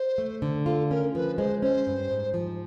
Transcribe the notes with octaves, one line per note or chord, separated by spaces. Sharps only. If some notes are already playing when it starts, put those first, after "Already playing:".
Already playing: C5
A3
D3
F4 A4
C#4 A#4
F3 B4
G#3 C5
C#4 C5
G2
G#2
F3